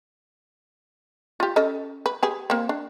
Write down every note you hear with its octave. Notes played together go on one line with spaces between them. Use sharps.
F4 G4
C#4 A4 D#5
B4
G4 G#4 B4
A#3 C4
D4